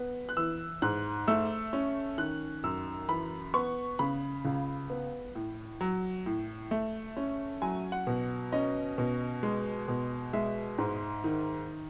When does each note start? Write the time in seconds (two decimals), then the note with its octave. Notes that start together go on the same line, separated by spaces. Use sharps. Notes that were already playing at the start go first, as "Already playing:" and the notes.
Already playing: B3
0.29 F#6
0.37 E3 E6
0.82 G#2 F#6
1.28 A3 E6
1.73 C#4
2.18 D#3 F#6
2.64 F#2 E6
3.09 E3 B5
3.54 B3 C#6
3.99 C#3 B5
4.45 C#2
4.90 B3
5.35 A2
5.81 F#3
6.26 A2
6.71 A3
7.17 C#4
7.62 F#3 G#5
7.92 F#5
8.07 B2
8.52 C#4 D#5
8.98 B2
9.43 G#3
9.88 B2
10.33 G#3 E5
10.79 G#2
11.24 D#3